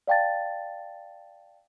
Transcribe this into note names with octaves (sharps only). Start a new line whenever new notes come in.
D5 F5 G5 A5 A6